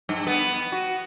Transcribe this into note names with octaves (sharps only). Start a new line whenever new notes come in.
G2
B3
F#4